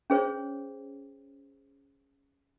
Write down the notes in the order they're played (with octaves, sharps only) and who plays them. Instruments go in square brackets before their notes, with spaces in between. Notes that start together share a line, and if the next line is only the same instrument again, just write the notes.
[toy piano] C#4 G#4 C5 C#5